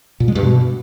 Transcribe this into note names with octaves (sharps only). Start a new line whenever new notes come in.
A#2
G#3
G2
B2